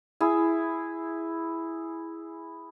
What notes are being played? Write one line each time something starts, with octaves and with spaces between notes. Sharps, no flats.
E4 G#4